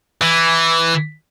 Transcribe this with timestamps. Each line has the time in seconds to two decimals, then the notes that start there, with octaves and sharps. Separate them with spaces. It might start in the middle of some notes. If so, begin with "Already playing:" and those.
0.22 E3